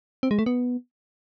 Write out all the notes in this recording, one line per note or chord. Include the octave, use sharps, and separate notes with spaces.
C4
G#3
A3
B3